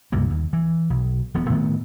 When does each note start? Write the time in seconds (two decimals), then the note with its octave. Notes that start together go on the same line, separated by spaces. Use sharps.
0.12 C#2 G2 C3 A#3
0.30 D#2
0.53 E3
0.90 B1
1.34 D#1 F3 B3
1.49 A2 D#3 A3 B3